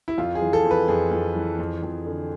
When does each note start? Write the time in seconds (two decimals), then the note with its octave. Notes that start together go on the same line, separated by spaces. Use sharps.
0.08 E4
0.18 F2 F4
0.35 G#4
0.42 E3
0.53 A4
0.65 F2
0.71 B4
0.88 F2 G#4
1.12 F2
1.35 E3
1.59 F2
1.83 F2
2.06 D3